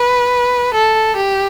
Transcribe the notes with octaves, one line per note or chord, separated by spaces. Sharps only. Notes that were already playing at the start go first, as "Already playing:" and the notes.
Already playing: B4
A4
G4